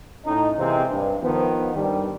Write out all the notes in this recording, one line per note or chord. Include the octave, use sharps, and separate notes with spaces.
A2 C#4 D#4
C3 E3 G#3 A#3 C4
G2
D#3 F3 B3
G2 D#3 G3